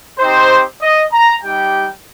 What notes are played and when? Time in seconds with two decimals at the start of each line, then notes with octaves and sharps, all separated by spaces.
0.19 C4 D#4 G4 C5
0.81 D#5
1.12 A#5
1.44 G3 D#4 G4 G5